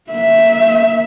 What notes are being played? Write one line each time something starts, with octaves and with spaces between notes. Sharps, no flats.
A#3 E5